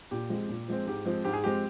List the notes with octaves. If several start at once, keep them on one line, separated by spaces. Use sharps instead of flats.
A#2 G4
F3 G#3 C4
A#2
F3 G#3 C4
G#2 G4
F3 G#3 C4
G#2 G4
G#4
F3 G#3 C4 G4